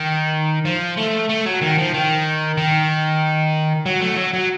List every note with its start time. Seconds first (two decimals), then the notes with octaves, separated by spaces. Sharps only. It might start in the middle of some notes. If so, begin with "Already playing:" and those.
Already playing: D#3
0.65 F3
0.97 A3
1.29 A3
1.46 F#3
1.61 D#3
1.78 F3
1.94 D#3
2.57 D#3
3.86 F#3
4.01 A3
4.16 F#3
4.33 F#3